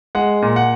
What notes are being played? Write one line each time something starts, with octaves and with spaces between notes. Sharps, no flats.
G#3 F#5
A#2
F#5